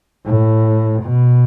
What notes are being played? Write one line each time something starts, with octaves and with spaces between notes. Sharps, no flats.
A2
B2